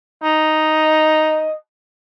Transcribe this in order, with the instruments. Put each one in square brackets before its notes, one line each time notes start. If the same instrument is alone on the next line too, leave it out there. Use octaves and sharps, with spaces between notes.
[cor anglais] D#4 [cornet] D#5